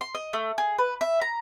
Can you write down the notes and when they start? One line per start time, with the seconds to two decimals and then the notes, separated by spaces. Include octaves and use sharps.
0.01 C6
0.15 D#5
0.33 A3
0.58 G#4
0.78 B4
1.01 E5
1.21 A#5